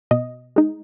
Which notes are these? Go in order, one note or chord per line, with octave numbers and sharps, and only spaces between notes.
B2 D#5
G#3 D#4